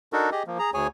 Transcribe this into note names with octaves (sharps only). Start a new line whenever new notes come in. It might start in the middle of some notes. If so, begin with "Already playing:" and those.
D4 D#4 F#4 A4 A#4
G4 G#4 D#5
F3 A#3
G#4 A#5
D2 G#4 C#5 G#5